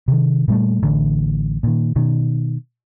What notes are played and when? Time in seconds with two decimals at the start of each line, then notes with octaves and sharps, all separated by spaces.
0.08 C3 D#3
0.48 A#2 G3 A3
0.83 A1 D3
1.63 A#2 D#3
1.96 B2 D#3